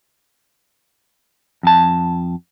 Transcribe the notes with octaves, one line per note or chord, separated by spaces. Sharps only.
F2 A5